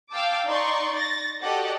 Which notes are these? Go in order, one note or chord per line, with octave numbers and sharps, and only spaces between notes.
F5 G5 A5 D6 E6
D#4 D5 C6 C#6
A6 A#6
F#4 G4 A4 D5 D#5 F#5